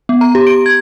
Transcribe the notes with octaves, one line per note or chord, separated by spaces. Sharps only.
B3
A#5
G4
D7
G#6